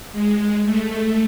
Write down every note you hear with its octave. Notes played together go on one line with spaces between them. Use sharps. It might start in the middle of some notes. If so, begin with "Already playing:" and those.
G#3
A3